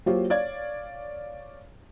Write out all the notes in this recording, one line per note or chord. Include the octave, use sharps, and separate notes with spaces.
F#3 A#3 F4 G4 C5 C#5
C#5 D5 F5 G#6